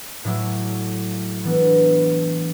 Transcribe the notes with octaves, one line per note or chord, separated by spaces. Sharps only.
A2 F#3 A3 E4 G4
E3 B3 D4